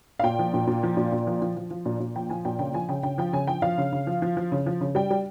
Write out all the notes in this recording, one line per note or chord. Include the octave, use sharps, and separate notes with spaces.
F5
A#2 G5
F3
A#2
A#2
F3
A#2
A#2
F3
F3
F3
F3
A#2
A#2
F3 G5
F3 G#5
A#2 G5
C#3 G5
F3 G#5
C#3 G5
C#3 G5
F3 G5
C#3 G#5
F3 G5
F3 F5
C#3
C#3
F3
F3
F3
C#3
F3
C#3
G3 G5
G3